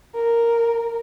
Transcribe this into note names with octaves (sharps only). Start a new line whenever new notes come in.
A#4